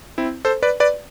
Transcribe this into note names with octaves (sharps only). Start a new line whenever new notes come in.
C4 E4
A4 C5
B4 D5
B4 D5